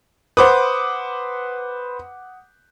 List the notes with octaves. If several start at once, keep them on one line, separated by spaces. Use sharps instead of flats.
B4 C5 F#5 D6 D#6